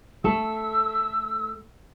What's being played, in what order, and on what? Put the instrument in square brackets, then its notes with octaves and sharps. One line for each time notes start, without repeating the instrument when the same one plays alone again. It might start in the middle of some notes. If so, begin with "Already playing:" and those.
[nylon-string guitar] A3 A4 [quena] E6